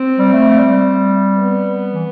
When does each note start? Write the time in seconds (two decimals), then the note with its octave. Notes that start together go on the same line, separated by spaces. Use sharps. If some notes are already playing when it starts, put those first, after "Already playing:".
Already playing: C4
0.19 G3
0.32 A3
0.50 A3
0.59 G3
1.39 B3
1.93 E3